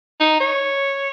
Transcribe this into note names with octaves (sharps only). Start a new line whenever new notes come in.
D#4
C#5